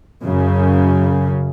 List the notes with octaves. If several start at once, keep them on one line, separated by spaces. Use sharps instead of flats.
F#2 C#3